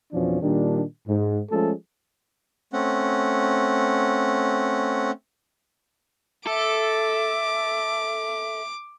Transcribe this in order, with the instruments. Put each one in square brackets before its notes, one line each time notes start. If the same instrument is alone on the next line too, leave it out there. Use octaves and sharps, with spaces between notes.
[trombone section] F2 B2 E3 F3 C#4 D4
A#2 D#3 G3 D4
G#2
F3 G#3 A3 C#4 G#4 A4
[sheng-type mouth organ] A3 C4 C#4 F#5
[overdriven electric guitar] A4 [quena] E5 [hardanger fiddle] D6